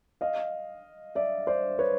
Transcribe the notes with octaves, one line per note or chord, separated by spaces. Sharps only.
D#5 F5
D5 E5
C5 D5
B4 C#5